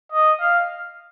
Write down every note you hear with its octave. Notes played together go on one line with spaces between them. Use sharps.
D#5
F5